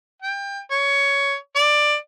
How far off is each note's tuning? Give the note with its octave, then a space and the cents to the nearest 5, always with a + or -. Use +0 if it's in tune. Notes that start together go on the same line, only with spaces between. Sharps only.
G5 +25
C#5 +15
D5 +15